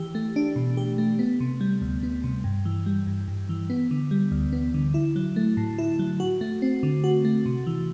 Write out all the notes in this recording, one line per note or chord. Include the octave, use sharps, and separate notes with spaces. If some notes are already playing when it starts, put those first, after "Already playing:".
Already playing: E3 G4
A3
D4
B2
G4
A3
B3
C3
G3
D2
B3
C3
G2
E3
G3
G2
G2
E3
B3
D3
G3
D2
B3
D3
E4
F#3
A3
A2
E4
F#3
F#4
A3
C4
D3
F#4
A3
C3
E3